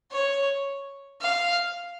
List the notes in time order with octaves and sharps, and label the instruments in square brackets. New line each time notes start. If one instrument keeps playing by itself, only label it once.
[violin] C#5
F5